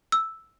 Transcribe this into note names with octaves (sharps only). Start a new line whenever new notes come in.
E6